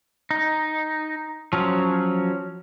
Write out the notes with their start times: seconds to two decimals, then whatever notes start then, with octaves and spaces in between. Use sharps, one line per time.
0.31 D#4
1.53 F3 F#3 C#4